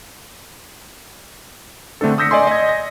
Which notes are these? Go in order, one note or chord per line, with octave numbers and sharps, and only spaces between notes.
D3 A3 C4 D4 A4
D#6 E6 G6 A#6 B6 C#7
D5 D#5 G#5 C6
D#5 G#6
A#6